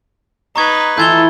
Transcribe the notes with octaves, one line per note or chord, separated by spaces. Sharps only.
D#4 B4 A#5 C#6 G#6
E3 F4 A4 G6 G#6 G7